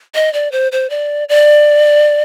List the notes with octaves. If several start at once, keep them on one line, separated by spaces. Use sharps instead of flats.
D#5
D5
C5
C5
D5
D5